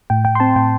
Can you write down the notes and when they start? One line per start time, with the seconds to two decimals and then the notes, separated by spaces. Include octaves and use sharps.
0.10 A2 G5
0.25 A2 G5
0.35 C6
0.40 C4 A5
0.56 A2 G5